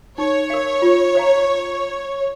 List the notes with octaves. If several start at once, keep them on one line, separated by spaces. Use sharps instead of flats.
D#4 C#5
A#4 F5
F4
C5 F5 A#5